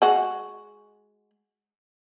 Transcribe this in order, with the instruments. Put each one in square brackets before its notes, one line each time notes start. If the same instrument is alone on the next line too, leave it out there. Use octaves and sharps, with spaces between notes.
[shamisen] G#3 F#4